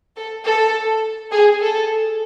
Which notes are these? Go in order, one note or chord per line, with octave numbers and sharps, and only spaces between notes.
A4
A4
G#4
A4